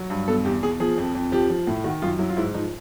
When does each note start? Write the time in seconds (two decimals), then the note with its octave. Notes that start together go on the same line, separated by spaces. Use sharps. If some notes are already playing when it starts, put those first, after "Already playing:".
Already playing: F#3
0.10 G2
0.28 B2 A4
0.45 E2 G4
0.63 B2 G#4
0.80 F3 G#4
0.98 F2
1.15 F2
1.32 F3 G4
1.50 F3
1.67 A2
1.84 D#3 F#4
2.02 F#2 F4
2.19 F#3 E4
2.29 F4
2.37 G#2 E4
2.54 F3 D#4